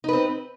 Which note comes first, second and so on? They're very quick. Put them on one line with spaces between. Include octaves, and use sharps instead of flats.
D#4 B4 C4